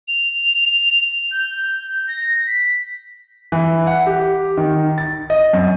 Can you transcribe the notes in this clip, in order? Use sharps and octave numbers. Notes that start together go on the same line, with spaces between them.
F7
F7
G6
A#6
B6
E3
F#5
G4
D#3
A6
D#5
F#2